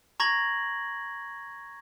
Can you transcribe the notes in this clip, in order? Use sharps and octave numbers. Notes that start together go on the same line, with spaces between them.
A#5 C#6 G#6 A#6 F#7